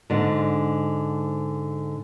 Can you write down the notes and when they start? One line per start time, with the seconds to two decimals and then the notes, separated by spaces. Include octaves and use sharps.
0.10 G#2 D3